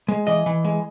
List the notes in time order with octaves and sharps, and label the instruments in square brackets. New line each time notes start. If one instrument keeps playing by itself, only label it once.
[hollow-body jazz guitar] G#3
E3 D#5
E3
G#3